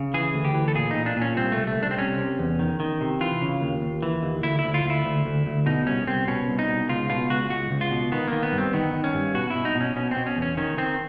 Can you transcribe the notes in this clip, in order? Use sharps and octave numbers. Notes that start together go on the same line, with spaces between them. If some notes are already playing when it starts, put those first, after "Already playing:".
Already playing: C#3
E3 G#4
D2
G4
E3
A4
A#2 G#4
D#4
A#2
D4
A#2
C#4
C2 C4
C2 A3
A3
C2 D4
C4
C3 C#4
C3
E2
D#3
D#3
C3
E3 F4
C#3
D#2
D#2
E3
D#2
D2 E4
E4
D2
F4
D2
E4
D2
D2
D2
B2 D#4
C2 C#4
C2 C4
B2 C#4
C2
D#4
B2
C#2 F4
B2 F4
C#2 F#4
C#2 F#4
C#2
F4
B2
D#3 B3
D#3 A#3
B3
G2
C4
D#3 B3
D#3
C#4
G2
B2 F#4
B2 E4
D#4
B2
C#4
B2 C#4
C4
B2
C#4
E2
C#4
D#3 C#4
D#3 C4